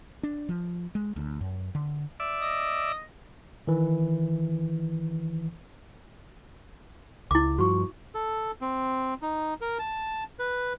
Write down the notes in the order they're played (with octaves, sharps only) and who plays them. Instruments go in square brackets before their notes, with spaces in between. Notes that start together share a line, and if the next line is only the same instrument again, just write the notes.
[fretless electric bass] D4
F3
G#3
D2
F#2
D3
[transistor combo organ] D5 E5
[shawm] D#5
[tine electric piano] D#3 E3
[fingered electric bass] C#2 [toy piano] E4 D6
[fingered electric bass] G2 F3 [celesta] F#4 C#6
[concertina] A4
C4
D#4
A#4
A5
B4